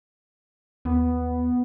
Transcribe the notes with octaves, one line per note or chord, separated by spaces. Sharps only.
D#2 B3